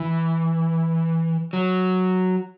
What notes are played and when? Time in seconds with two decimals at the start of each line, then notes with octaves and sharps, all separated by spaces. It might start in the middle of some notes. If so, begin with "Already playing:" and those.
Already playing: E3
1.53 F#3